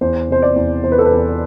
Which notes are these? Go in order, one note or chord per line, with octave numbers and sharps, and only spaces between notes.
E2 C5
C3 C5
D5
E2
E2 C5
B4
A4
B4
E2